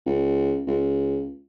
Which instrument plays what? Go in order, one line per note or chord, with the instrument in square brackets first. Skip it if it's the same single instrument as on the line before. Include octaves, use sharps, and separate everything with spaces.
[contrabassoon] C#2
C#2